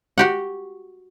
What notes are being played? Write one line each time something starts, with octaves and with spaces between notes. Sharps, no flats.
F#4 G4 F#5